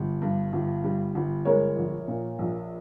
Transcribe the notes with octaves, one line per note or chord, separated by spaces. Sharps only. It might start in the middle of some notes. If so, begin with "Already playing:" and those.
Already playing: G1 G3
G2
G1
G3
G1
G#3 A#4 C#5
A#1
A#2
A#1